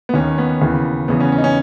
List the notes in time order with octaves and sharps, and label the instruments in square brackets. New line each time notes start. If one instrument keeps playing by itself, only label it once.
[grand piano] B3
D#2 D#3 C#4
B3
D#2 C#3 E3
E2 C#3 E3 B3
C#4
C#4
D#4
C#4